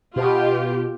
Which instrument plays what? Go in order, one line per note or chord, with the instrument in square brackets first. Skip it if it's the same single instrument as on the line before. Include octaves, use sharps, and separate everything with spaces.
[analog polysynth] B2 [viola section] F4 G4